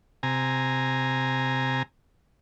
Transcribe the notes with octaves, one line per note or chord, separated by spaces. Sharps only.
C3 G#5 A#5